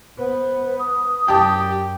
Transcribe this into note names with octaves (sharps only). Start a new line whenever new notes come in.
B3 C5
D#6
F#2 G4 G5 A5